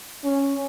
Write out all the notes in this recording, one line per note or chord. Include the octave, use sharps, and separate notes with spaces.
C#4